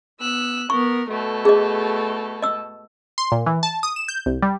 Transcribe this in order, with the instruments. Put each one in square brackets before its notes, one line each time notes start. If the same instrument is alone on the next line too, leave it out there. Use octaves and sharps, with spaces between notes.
[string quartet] B3 E6 F#6
[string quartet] B3 A#4 [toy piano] C#6
[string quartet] B2 A3 A4
[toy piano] G#4 D#5
D#5 E6
[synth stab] C6
A#2
E3
A5
D#6
E7
G6
C2
G3